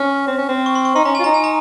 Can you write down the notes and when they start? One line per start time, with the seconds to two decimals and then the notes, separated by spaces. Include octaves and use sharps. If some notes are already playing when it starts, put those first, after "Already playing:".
Already playing: C#4 F6
0.27 C4
0.38 C#4
0.49 C4
0.66 C#6
0.75 C6
0.85 C#6
0.95 D#4 C6
1.05 C#4 A#5
1.15 F4 G#5
1.24 D#4 A#5
1.34 G#5
1.44 A#5